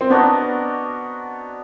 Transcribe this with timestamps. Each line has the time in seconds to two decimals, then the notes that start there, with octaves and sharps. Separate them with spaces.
0.01 C4
0.10 B3 D4 F#4 A#4 D#5